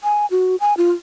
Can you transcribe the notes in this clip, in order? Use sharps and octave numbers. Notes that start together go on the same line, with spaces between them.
G#5
F#4
G#5
F4